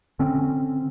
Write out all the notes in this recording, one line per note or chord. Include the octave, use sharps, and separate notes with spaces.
D3 C4 C#4